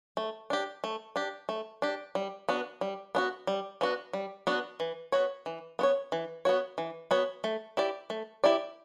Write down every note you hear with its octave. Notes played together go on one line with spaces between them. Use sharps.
A3
D4 G4
A3
D4 G4
A3
D4 G4
G3
B3 D4 F#4
G3
B3 D4 F#4
G3
B3 D4 F#4
G3
B3 D4 F#4
E3
B3 F#4 C#5
E3
B3 F#4 C#5
E3
B3 F#4 C#5
E3
B3 F#4 C#5
A3
E4 G4 D5
A3
E4 G4 D5